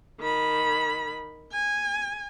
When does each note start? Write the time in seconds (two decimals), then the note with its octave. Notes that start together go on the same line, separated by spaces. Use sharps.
0.20 D#3 B5
1.52 G#5